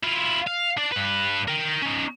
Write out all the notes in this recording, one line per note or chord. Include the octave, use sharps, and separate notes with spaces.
E4 F4
F5
D4 D5
G2 B4
A#4 G5
C#4 D#4